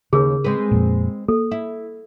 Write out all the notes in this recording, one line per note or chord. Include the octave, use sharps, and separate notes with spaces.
D#2 C#3 G#4 A#4
G#3 C4 B4
F2 A#2
A#3 A4
E4